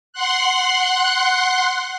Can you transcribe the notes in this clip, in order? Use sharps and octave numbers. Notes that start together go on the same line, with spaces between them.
F#5 C6 F#6